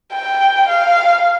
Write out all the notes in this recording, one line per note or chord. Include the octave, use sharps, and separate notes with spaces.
G5
F5